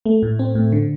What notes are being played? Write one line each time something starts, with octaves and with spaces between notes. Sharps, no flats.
A3
A2
C4
A2
D3